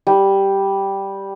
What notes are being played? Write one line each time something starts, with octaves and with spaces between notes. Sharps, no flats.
G3